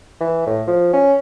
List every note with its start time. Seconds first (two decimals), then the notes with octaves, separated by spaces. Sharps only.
0.21 E3
0.46 A2
0.67 F3
0.93 C#4